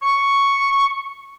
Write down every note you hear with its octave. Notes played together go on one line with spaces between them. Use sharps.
C#6